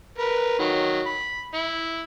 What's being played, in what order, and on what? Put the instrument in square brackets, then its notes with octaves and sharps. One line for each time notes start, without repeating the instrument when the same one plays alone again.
[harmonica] A#4 B4
D#3 F#3
B5
E4